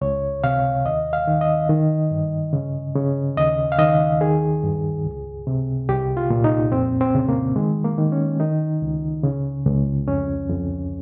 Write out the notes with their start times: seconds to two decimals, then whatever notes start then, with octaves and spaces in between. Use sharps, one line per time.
0.01 C#2 C#5
0.44 C3 F5
0.85 D#2 D#5
1.13 F5
1.27 D#3
1.41 D#5
1.69 D#3
2.11 G2
2.53 C#3
2.96 C#3
3.37 D#2 D#5
3.72 F5
3.78 D#3 D#5
4.21 D#3 G#4
4.63 G2
5.05 C#2
5.47 C3
5.89 C2 G4
6.17 F4
6.30 A#2
6.44 D#4
6.72 F2 C4
7.01 C4
7.15 C#3
7.29 A#3
7.56 D#3 G#3
7.84 A#3
7.98 D#3
8.12 C#4
8.40 D#3 D#4
8.82 C#2
9.23 C#3
9.66 C#2
10.08 F2 C#4
10.50 F2